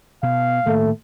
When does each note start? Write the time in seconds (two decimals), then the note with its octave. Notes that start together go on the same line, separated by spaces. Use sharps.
0.23 B2 F5
0.66 A2 D#3 A3 A#3